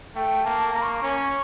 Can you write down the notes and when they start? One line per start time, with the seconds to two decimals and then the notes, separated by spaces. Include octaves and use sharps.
0.15 A3 G5
0.44 A#3 A5
0.73 A#3 A#5
0.83 C#6
0.92 D6
1.01 C#4 C#6